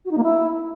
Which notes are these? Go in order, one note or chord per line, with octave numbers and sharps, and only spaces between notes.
F#4
D#4
A#3
E4